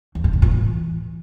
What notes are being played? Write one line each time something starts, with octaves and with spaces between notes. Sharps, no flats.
E2
A2
B2
A#2
E3